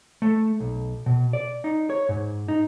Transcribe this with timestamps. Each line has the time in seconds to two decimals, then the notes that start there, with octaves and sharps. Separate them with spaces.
0.22 A3
0.60 B1
1.06 B2
1.33 D5
1.64 D#4
1.90 C#5
2.09 G#2
2.48 D#4